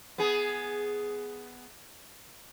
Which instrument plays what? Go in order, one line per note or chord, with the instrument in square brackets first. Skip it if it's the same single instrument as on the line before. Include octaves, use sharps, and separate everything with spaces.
[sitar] B3 G#4